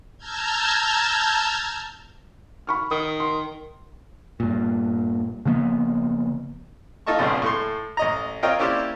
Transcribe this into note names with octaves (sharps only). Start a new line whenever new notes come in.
A5 A#5 E6 F6 G6 G#6
B5 C#6 F6
D#3 D#6
C6
G2 A#2
C#3 F3 A#3 B3
D#4 F4 A4 D#5 A5 C#6
G#1 C#2 G2 B2
A2 A3 C6
A1 D#5 A#5
C4 F4 A#4 C#5 D#5 G5
A#3 C#4 E4 G4 C5 D5